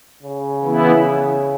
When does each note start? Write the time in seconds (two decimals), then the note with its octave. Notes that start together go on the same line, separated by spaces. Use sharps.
0.22 C#3
0.63 E3 B3 E4